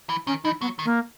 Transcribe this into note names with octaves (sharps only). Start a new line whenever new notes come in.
E3
D#3 C#4
E3 D#4
F#3 B3
D#3
A#3